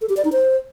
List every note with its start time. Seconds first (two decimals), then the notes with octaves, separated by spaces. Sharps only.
0.01 A4
0.09 G4
0.17 D5
0.25 D#4
0.32 C5